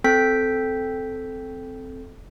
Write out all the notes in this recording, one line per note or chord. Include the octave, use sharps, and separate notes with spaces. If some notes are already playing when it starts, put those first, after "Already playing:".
C4 A4 G5 G6 B6